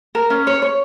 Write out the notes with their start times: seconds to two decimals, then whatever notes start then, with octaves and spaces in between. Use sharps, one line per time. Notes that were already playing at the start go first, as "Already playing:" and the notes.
0.15 A#4
0.30 C#4
0.47 C#5
0.62 C#5